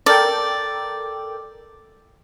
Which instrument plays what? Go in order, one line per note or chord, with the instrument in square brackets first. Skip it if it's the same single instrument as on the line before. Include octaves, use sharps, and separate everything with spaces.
[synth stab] A4 A#4 G5 [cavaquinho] D5